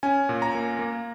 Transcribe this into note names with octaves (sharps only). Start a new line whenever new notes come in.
C#4 G#5
A#2
A#5
A#3
A#3